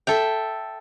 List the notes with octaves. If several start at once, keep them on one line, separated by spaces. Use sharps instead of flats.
A4 E5 G5